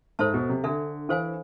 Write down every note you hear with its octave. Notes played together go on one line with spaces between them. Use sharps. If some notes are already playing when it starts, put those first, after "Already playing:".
G#2 A4 C5 E5 A5
B2
C3
D3 D4 A4 E5
E3 A4 C5 F5 G#5